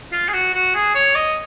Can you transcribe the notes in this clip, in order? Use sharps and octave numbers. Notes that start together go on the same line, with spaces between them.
F4
G#4
F#4
F#4
G#4
C#5
D#5